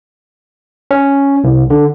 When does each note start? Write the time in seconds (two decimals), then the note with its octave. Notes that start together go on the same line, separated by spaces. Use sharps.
0.91 C#4
1.44 C2
1.70 D3